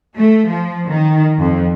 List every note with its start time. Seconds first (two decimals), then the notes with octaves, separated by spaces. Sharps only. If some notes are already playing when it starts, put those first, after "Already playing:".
0.18 A3
0.51 F3
0.90 D#3
1.39 F2